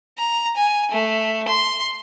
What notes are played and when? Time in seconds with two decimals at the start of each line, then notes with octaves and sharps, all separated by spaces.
0.18 A#5
0.57 G#5
0.91 A3
1.48 C6